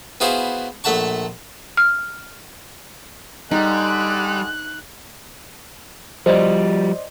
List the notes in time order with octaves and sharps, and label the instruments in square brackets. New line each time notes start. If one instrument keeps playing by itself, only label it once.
[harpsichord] B3 E4 F#4 G#4 C5 F5
A#1 A3 E5 F#5 A5 C#6
[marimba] F6
[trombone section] D3 G#3 [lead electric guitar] G3 [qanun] D#4 F#5 [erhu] F#6
[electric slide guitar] F3 G3 [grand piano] C5 D5 D#5